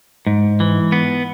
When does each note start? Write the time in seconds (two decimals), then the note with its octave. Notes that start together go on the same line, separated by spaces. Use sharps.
0.27 G#2
0.60 E3
0.92 B3